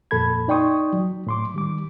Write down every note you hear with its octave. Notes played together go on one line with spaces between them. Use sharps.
F2 A#2 A4 B5 G#6
D#4 D5 G5 C6 C#6 D#6
F#3
A2 C6 D6
D#3 G3 D6